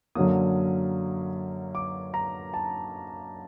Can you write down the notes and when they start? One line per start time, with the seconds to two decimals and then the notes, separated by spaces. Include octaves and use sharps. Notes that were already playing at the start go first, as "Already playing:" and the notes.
0.15 F#2 D3 F#3 A#3 D#6
1.75 D6
2.14 A#5
2.54 A5